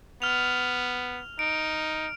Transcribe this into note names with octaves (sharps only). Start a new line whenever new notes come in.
B3 F6 F7
D#4 D7